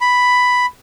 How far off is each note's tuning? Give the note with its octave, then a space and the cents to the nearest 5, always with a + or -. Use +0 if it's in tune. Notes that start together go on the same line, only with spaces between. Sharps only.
B5 +5